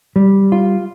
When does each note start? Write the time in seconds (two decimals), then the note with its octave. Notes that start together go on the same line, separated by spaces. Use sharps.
0.16 G3
0.52 F4